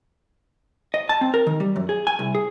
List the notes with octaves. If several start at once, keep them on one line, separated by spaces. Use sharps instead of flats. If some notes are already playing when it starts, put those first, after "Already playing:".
D#5
A5
C4
A#4
D#3
G3
F#2
G#4
G#5
C2
G#4